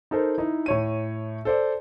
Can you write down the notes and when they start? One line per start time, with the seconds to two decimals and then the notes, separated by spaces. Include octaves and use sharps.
0.11 D#4 A4 A#4 C5
0.38 D#4 E4
0.66 A2 C#5 D#7
1.45 A4 C5 D5